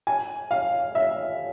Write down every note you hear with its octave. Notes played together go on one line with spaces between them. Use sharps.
G#5
F5
E5